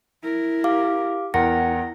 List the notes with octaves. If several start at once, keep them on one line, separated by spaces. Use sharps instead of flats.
E4 A#4
G4 F5 D6
E2 E4 A#4 F#5 G5 A#5 A#6